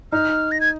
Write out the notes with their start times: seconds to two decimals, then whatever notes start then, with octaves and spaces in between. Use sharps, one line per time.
0.12 D#4 F6
0.51 A#6
0.60 G#6